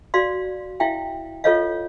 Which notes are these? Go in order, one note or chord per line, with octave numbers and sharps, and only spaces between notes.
F#4 D5 F5 C6
E4 E5 F5 G5
F4 A4 B4 C#5 D#5 F5